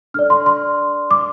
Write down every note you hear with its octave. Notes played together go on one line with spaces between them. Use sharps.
D4 A4 D5 F6
C6
C6
D6